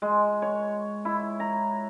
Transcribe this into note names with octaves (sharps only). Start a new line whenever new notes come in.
G#3
C#5
E4
A#5